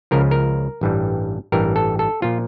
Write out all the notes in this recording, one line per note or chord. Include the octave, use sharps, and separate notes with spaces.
C#2 C#3 F3 A#4
A#4
A1 G2 E3 G3
A1 G2 E3 G3 A#4
A4
A4
A#2 F3 F4